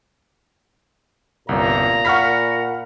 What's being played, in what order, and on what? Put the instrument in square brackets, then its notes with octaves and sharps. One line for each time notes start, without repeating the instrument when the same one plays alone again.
[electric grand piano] G1 C2 [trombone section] A#2 [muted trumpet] A#5
[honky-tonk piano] F#5 F6 B6 [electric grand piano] B5 C#6